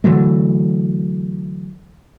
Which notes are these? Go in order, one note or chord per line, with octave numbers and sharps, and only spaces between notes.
D3 E3 F#3 A3